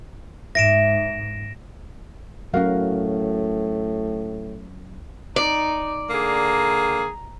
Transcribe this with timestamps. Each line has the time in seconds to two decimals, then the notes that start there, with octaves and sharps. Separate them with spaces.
0.55 G#2 E5 A#6 D7 E7
2.54 A2 F#3 C#4 F#4 A#4 F5
5.36 D#4 D5
6.09 D3 A#3 G#4 A#5